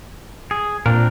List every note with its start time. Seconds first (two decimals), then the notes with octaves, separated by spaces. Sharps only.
0.51 G#4
0.86 A#2 C4 D4 A#4